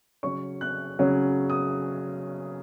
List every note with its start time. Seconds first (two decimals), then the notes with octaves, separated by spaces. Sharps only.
0.23 C#3 F#3 C#4 C#6
0.61 F#6
0.99 C#3 F#3 C#4
1.50 D#6